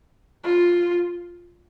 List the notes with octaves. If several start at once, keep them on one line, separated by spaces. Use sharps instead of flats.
F4